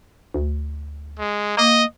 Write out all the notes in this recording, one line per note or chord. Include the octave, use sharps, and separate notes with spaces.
D2
G#3
A#3 D#5